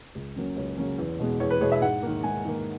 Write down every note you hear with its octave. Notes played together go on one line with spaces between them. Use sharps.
C#2
C#3 F#3 A#3 C#4
C#2 C#5
C#3 F#3 A#3 C#4
E2
B2 G#3 B3
E2 C#5
B4
B2 G#3 B3 C#5
E5
G#2 F#5
D#3 A#3
G#2 G#5
D#3 A#3